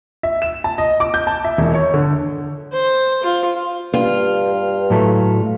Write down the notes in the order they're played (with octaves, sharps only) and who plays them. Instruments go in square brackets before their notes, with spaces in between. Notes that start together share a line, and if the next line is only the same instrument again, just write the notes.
[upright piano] E5
E7
A5
D#5
D6
G6
A5
E5
E1
C#5
D3
[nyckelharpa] C5
F4
[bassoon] G2 [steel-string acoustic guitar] F4
[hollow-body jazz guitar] A2 F#3 A3